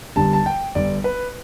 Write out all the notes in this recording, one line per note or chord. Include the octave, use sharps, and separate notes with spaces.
G1 G2 D3 G3 A5
A5
G5
G1 G2 G3 D5
B4